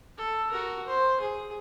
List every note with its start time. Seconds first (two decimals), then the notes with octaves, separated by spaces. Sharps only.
0.18 A4
0.52 F#4 A#4
0.86 C5
1.20 G#4